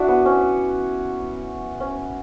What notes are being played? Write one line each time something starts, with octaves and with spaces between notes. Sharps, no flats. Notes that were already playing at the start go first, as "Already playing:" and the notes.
Already playing: D4 E4 F#4
B3
C#4
C#4